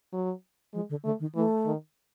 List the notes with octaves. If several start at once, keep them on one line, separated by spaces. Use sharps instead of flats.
F#3
F3 G#3
D3
D3 A3
D#3
E3 A3
D#3